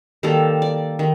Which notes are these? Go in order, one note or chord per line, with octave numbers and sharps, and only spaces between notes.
D#3 G3 A#3 A4
D5
D#3